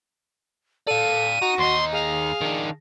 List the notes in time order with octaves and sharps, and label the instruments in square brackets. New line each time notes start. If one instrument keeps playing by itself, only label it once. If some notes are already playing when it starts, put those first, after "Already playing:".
[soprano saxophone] A4 [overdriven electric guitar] D5 F5 [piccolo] D#7
[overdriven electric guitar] D#4 [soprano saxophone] F#4
[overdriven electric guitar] D#2 D#4 [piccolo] C6
[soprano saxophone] G#4 [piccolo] F5
[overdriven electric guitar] D#3 D4